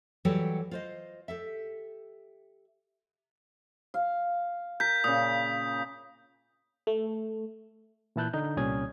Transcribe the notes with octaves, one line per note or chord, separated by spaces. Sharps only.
E3 F#3 G3 G4 A4 C#5
F4 C5 D#5
G4 A4 E5
F5
A#4 G6 B6
A#2 C#3 D#6
A3
A#2 E3 E4 A5 F#6 G6
D3 D#4 G6
C2 A#2 G3 C#4 D#6 G#6